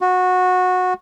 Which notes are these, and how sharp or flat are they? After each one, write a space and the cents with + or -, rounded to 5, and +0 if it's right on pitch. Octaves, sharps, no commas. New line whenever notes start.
F#4 -15